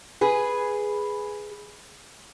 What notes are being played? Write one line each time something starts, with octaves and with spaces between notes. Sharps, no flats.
G#4 B4